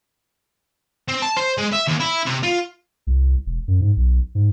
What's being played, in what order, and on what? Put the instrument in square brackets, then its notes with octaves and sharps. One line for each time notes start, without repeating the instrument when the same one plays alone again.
[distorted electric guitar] C4
A5
C5
G#3
E5
D#2
E4
C3
F4
[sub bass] C2
E1
F#2
G#2
B1
G#2